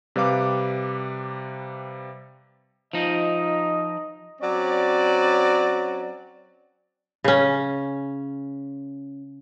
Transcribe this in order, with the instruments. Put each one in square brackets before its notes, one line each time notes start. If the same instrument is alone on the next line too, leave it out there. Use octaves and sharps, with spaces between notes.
[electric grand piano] C3 G3 B4 F5 D6
[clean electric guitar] F3 D#4 [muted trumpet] D#5
[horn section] F#3 C4 C#4 D5
[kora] C#3 C#4